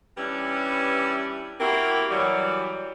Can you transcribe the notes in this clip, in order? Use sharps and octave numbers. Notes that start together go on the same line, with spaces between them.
E3 G3 C#4 D4 E4 B4
A#3 C4 E4 F#4 G4 A#4
E3 F#3 G3